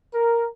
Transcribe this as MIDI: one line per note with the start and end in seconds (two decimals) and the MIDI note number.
0.14 0.47 70